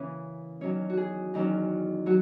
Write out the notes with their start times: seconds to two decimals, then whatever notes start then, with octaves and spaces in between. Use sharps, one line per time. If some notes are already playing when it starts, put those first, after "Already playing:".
Already playing: C#3 E3 A#3 C#4 B4 C#5
0.61 E2 D#3 F#3 C#4 C#5
0.90 F#4
0.97 G#4
1.34 E2 D#3 F#3 C#4
2.06 F#3 F#4